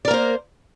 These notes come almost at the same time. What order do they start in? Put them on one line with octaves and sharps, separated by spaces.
D5 A#4 A#3 C5